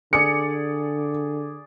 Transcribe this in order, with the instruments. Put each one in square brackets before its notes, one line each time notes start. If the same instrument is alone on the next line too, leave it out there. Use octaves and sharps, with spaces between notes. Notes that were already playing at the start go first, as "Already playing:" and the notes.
[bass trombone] D3 [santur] G#4 D5 [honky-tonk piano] C#7